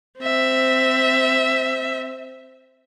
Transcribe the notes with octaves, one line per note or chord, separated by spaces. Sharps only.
C4 E5